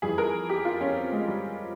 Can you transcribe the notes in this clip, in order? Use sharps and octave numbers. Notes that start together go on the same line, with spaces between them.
F2 E3 G3 G#4
A#4
G4
F4
C#4
C4
G#3
G3